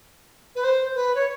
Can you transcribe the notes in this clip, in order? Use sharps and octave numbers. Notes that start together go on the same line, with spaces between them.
B4
C5
B4
C#5